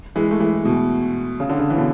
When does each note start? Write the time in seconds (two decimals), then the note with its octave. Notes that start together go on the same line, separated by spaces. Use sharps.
0.16 E3 G#3
0.31 A3
0.40 E3 G#3
0.65 B2
1.40 C#3
1.49 D3
1.59 C#3
1.70 E3
1.77 B2 D3